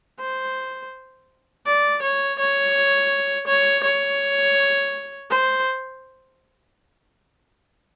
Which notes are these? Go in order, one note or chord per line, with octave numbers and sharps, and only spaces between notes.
C5
D5
C#5
C#5
C#5
C#5
C5